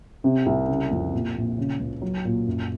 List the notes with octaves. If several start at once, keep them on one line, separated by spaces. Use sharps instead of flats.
C3
C2
C#3
F2
A#2
A#1
C#3
C#2
F#3
A#2
F#2